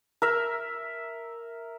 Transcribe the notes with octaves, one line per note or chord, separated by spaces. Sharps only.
A#4 E5